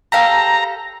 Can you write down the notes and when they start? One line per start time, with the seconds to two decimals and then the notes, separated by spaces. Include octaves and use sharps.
0.12 G4 A4 F5 A#5